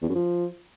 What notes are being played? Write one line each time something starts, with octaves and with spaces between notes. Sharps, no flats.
E2
F#2
F3